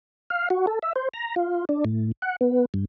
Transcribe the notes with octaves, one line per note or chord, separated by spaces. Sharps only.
F5
F#4
A4
E5
C5
A#5
F4
D4
A2
F#5
B3
G2